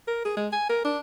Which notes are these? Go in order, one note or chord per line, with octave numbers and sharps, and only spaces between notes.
A#4
G#4
G#3
G#5
A#4
D4